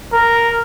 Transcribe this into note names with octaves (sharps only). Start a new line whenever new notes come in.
A#4